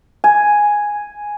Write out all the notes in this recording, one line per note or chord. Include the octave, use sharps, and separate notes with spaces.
G#5